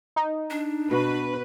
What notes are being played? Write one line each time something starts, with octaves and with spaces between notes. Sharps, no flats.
D#4
D4
B2 F#4 B4